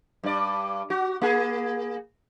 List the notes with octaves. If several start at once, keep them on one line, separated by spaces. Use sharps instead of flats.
G2 D5
F#4
A#3 G#4